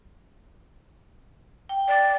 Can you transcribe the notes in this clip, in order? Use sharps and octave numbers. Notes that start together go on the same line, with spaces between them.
G5
D5